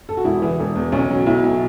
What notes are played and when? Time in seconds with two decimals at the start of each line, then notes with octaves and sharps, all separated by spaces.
0.09 A4
0.17 F#4
0.24 E1 E4
0.42 E3
0.60 E1
0.76 E2
0.92 B1 C#4
1.10 F#3
1.26 B1 E4
1.44 B2